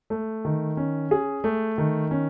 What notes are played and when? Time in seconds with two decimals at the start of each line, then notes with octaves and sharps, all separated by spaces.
0.10 A3
0.45 D#3
0.77 C#4
1.11 G#4
1.44 A3
1.78 D#3
2.11 C#4